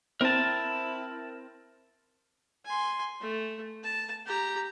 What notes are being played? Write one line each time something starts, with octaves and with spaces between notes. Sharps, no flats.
C4 E4 A#4 A5
G#5 C6
A3
A5
G4 A#5